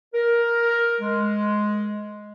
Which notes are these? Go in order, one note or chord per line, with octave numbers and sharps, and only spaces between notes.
A#4
G#3